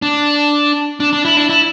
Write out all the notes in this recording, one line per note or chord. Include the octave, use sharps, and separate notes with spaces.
D4
D4
D4
E4
D4
E4